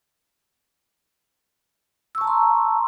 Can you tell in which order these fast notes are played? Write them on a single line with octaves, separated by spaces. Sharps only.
E6 C#6 A5 A#5 C6